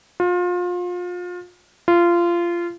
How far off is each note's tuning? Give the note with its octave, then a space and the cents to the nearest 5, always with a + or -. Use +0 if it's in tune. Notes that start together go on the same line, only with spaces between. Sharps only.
F4 +30
F4 -20